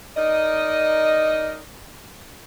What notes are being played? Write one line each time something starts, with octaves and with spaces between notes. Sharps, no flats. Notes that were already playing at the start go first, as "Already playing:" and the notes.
D#4 A#4 D5 D#5